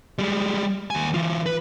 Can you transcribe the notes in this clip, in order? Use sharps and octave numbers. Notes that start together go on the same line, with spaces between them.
G3 G#3
D#2 G#5
E3 F4
B4